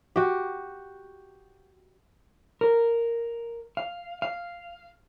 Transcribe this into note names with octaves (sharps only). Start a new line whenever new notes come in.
F#4 G4
A#4
F5
F5